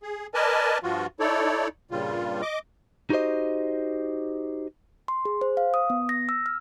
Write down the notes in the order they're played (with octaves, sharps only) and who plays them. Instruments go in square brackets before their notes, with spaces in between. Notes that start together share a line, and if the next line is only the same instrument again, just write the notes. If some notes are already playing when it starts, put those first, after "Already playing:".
[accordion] G#4
A#4 B4 D5 D#5 G#5 A5
G2 F3 F4 F#4
D#4 E4 A4 C#5 D5
G2 A#2 C#3 G3 F4
D#5 D6
[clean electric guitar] D#4 F#4 G4 C5 D#5
[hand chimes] C6
G#4
C5
F5
D#6
B3
A#6
E6
F6